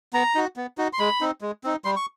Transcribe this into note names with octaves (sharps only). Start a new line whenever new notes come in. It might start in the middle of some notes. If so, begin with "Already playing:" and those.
B3 A#5
D#4 F#4
B3
D#4 F#4
C6
G#3 B5
C4 D#4
G#3
C4 D#4
G3 C6
C#6